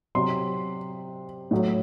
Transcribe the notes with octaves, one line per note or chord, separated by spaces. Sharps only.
C3 F#3 C6
A2 F#3